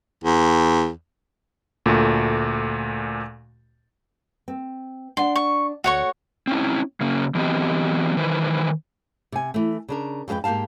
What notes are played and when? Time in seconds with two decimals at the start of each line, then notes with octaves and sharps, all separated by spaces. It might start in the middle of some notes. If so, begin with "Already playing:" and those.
0.24 E2
1.86 D2 A#2 A3
4.48 C4
5.17 D4 F#5 C6
5.36 C#6
5.84 D2 F#4 C#5 C#6
6.47 C4 C#4 E4
7.01 C#3 A#3 C#4
7.35 E3 F#3 B3 C4 G4 D#5
8.17 D#3 E3 B4 C5
9.32 C3 G#5
9.54 E3 A3
9.88 C#3 D4 A#4
10.28 F2 G#3 A4 B4 G5
10.44 G#2 A#3 G4 F5 A5